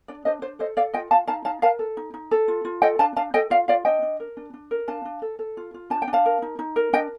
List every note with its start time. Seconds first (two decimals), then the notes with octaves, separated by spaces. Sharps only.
0.08 D4 D5
0.25 D4 C5 D#5
0.42 D4 C5
0.59 A4 C5 D#5
0.77 A4 D5 F5
0.94 F4 D#5 G5
1.11 F4 F5 A5
1.27 D#4 F5 A5
1.45 D#4 F5 A5
1.62 A#4 F5 A5
1.79 A4
1.97 D#4
2.14 D#4
2.31 A4
2.48 F4
2.65 F4
2.82 A4 D#5 G5
2.99 D4 F5 A5
3.16 D4 F5 A5
3.34 A4 D#5 G5
3.50 F4 D5 F5
3.68 F4 D5 F5
3.85 D4 D#5 G5
4.02 D4
4.20 A#4
4.37 D4
4.54 D4
4.71 A#4
4.88 D4 F5 A5
5.05 D4
5.22 A4
5.39 A4
5.57 F4
5.74 F4
5.90 D4 A5
6.02 G5
6.08 D4
6.13 F5 A5
6.26 A#4
6.42 D#4
6.59 D#4
6.76 A#4
6.93 D4 D#5 G5